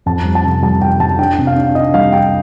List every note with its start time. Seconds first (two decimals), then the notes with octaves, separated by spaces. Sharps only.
0.06 F2 A5
0.25 G3
0.35 A5
0.44 C3
0.63 G3 A5
0.81 G3 G5
1.00 G3 A5
1.19 D4 G5
1.38 C3
1.47 F5
1.56 D4
1.75 D4 D#5
1.94 G3 F5
2.12 G3 G5